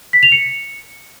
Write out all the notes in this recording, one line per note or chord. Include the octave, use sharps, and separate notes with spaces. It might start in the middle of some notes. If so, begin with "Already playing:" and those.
B6
F7
C#7